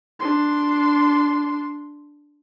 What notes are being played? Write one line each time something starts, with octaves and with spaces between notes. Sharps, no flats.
D4 C6